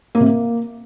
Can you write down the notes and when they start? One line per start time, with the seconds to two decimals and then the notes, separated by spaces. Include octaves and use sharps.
0.15 A#3
0.20 C3
0.26 A#3